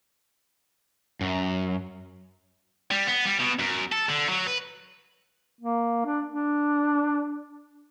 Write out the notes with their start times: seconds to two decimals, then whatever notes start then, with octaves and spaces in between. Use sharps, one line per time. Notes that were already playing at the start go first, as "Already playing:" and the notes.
1.21 F#2
2.91 G3
3.07 B3
3.25 G3
3.39 B2
3.59 F#2
3.92 A4
4.09 D3
4.29 F#3
4.47 B4
5.61 A#3
6.05 D4
6.27 D4